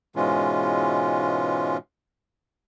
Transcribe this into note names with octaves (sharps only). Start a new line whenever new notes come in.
G#2 B2 E3 G#3 C#4 F4